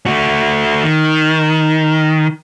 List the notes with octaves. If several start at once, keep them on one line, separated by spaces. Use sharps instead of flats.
A3 F#4
D#3